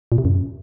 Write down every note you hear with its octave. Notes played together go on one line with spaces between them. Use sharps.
A#2
C3
F#2